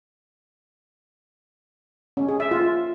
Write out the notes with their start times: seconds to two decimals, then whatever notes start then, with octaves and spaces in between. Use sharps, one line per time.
2.17 C#4
2.28 G#4
2.40 E5
2.51 F4